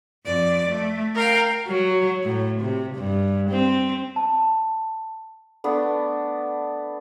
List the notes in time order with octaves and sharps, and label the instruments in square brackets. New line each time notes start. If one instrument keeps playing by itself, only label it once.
[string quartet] F2 D5
A3
A#4 F5 G5
[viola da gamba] F#3
A2
C3
G2
C4
[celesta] A5
[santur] A3 B3 D4